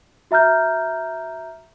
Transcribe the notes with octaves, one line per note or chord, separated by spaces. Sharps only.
F#4 E5 A#5 F6 G6